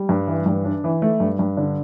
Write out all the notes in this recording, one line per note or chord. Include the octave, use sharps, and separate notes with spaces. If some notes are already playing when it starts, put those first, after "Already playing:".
Already playing: G3
G2
E3
G2
D4
E3
A3
G2
G2
D3